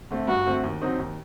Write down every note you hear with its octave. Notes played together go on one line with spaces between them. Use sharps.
D3 A3 C4
G2 F#4
D3 A3 C4
D#2
D3 F#3 C4 D#4
D#2